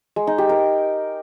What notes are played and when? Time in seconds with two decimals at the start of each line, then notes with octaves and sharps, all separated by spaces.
0.16 G#3
0.27 D#4
0.38 G4
0.49 A#4